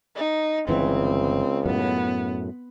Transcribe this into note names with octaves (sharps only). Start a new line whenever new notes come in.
D#4
G1 C#2 E3 C4
F#2 A2 B3